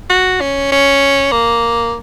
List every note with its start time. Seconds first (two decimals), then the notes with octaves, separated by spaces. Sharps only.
0.10 F#4
0.41 C#4
0.72 C#4
1.32 A#3